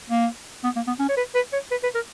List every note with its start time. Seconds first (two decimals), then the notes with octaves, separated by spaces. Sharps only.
0.10 A#3
0.64 B3
0.76 A#3
0.87 B3
0.99 C#4
1.09 C#5
1.17 B4
1.35 B4
1.53 C#5
1.71 B4
1.83 B4
1.95 A#4